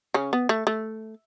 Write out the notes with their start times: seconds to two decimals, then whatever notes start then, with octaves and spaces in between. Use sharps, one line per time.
0.14 C#3 C#4
0.33 B3
0.49 A3
0.67 A3